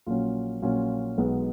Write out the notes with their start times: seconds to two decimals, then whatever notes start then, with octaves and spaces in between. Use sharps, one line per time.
0.06 A#1 A#2 F#3 C#4 F4
0.62 A#1 A#2 F#3 C#4 F4
1.18 B1 B2 G#3 B3